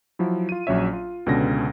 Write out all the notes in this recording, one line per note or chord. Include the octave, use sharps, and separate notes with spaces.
F3 F#3 E4
F4 D#7
A#1 F#3 C#4 C#5 E5
F4
C#2 B2 D3 C#4 A#6